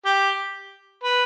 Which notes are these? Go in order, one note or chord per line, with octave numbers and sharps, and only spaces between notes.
G4
B4